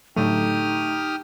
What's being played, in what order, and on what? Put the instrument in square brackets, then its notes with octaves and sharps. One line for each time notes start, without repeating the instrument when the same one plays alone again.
[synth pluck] A2 D3 F#3 [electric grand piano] A3 [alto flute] D#4 [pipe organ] G4 D#6 F6